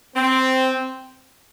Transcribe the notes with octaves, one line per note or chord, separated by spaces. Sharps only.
C4